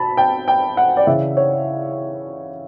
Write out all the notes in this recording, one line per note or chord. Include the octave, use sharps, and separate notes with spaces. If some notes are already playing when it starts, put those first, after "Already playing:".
Already playing: B2 A5 B5
G5
G5
F#5
D5
C#3 E3 E5
C#5